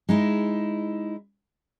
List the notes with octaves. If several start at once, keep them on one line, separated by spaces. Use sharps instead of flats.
G#3 D#4 E4